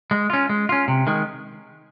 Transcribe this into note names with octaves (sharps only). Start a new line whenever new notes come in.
G#3
C#4 F4
G#3
C#4 F4
C3
D#3 G#3